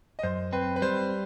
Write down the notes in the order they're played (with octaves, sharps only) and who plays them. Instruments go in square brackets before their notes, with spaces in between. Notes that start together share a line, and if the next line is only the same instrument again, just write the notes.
[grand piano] D#5
[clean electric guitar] F#2 [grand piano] C5
[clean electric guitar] C4 [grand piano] B4
[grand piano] B4
[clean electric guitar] G3 [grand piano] C5